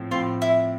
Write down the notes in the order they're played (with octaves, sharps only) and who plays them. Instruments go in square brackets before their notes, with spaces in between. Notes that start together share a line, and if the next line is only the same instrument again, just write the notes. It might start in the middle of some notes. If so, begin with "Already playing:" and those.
Already playing: [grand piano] A2 F3 C4
[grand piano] A2 F3 C4 [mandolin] F4
[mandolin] E4